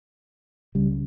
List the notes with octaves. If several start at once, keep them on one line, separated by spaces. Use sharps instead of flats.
C#2 C#3 G3